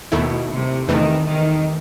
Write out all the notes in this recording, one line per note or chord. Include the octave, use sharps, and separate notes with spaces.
D#2 B2 D#3 A3 E4
C3
E2 C3 D#3 E3 A3
D#3